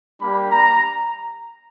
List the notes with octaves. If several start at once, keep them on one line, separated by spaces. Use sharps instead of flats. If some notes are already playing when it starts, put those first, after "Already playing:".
G3 A#3 D4 G4 B5
A#5